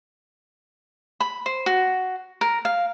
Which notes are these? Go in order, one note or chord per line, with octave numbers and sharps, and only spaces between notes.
B5
C5
F#4
A#4
F5